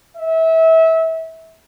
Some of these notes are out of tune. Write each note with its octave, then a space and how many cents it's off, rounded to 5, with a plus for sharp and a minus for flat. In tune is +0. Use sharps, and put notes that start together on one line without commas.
E5 -25